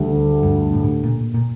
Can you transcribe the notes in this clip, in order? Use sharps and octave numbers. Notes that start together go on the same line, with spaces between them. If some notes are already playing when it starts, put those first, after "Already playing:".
Already playing: D2 D3 G3 G4
G2
A2
A#2
A#2